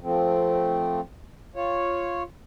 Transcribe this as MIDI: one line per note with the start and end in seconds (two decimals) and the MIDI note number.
0.01 1.00 53
0.01 1.00 57
0.01 1.00 60
1.56 2.23 65
1.56 2.23 73